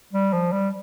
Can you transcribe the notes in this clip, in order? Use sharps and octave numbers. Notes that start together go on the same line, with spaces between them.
G3
F3
G3